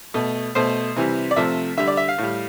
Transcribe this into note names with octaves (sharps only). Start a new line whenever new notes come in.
B2 A3
B2 A3 C5
C3 E3 G3
D5
C3 F3 A3 E5
D3 G3 E5
D5
E5
F5
A2 G3